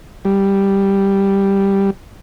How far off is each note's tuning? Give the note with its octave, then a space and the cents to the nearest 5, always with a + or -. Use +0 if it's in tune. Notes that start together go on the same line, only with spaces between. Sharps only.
G3 +5